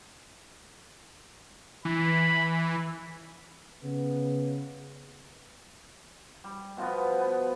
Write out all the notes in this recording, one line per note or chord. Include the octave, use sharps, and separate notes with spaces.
E3 B5
C#3 B3
G3
B2 F3 B3
B3